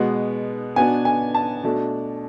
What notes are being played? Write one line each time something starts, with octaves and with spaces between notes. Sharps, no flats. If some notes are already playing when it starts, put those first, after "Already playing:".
Already playing: B2 G#3 B3
B2 B3 D4 G#5
G#5
A5
B2 A3 D4